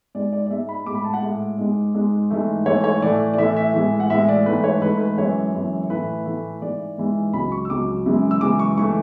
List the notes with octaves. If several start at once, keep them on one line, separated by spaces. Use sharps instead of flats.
G#2 G#3 D5
D5
D5
G#2 G#3 E5
B5
A2 G#3 B5 D6
A5
F#5
A2 G#3
G#2 G#3
G#2 G#3
G#2 E3 A3
G#2 E3 A3 C#5
C#5
A2 E3 A3 D5
D5
A2 E3 A3 E5
E5
A2 E3 G#3
F#5
A2 E3 G#3 E5
D5
G#2 E3 A3 B4
C#5
G#2 E3 A3 B4
B4
F#2 E3 G#3 C#5
F#2 E3 G#3
A2 E3 A3 B4
A2 E3 A3
G#2 E3 G#3 D5
G#2 E3 G#3
C#2 C#3 F#3 B5
C#6
E6
C#2 C#3 F#3 D6
F#2 C#3 E3 G#3
E6
F#2 C#3 E3 G#3 D6
C#6
G#2 E3 A3 C#6